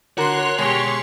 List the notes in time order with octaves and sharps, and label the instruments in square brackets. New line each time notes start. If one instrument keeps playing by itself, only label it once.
[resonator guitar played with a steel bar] D3 F#4 A#4 [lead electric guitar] C#5 [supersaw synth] C6 F#6
[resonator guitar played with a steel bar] B2 G#3 [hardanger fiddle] G4 G#4 [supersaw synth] C6 C#6